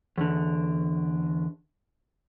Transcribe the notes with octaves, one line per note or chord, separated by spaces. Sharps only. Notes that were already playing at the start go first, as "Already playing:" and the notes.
E2 D3